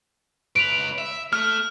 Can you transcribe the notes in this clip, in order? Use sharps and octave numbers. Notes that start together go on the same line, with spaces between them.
C#2 B4 D7 F7
E5
A3 F6